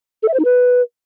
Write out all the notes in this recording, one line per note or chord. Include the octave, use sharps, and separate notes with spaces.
A4
E5
C5
D#4
B4